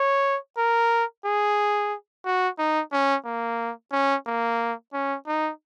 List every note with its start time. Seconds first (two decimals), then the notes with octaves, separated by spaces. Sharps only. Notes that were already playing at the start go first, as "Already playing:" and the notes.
Already playing: C#5
0.58 A#4
1.25 G#4
2.25 F#4
2.58 D#4
2.92 C#4
3.25 A#3
3.92 C#4
4.27 A#3
4.93 C#4
5.27 D#4